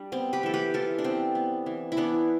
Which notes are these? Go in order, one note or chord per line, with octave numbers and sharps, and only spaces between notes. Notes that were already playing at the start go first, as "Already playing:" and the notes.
Already playing: G3 D4
B3 C4
G4 B4
E3 A4
G4 B4
E3 F4 A4
D4
B3 C4
B3
E3
E4
E3 B3 D4